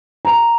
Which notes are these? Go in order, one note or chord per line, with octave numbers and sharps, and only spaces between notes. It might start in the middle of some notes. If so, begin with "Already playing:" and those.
A#5